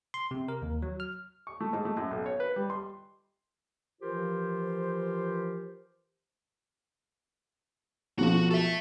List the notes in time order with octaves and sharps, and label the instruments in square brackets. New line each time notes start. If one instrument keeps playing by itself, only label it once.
[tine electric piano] C6
C3
A#4
D#2
F#3
F6
[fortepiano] C#6
A3
G#2
A3
F#2
B1
C#5
B4
G3
C6
[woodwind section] E3 F3 F4 G4 A#4 C5
[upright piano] B1 F3 C#6 [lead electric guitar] F#4
[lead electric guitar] A4 E5